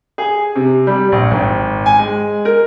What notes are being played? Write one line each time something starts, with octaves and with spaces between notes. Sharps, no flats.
G#4
C3
G3
A#1
G#1
G#5
G#3
A#4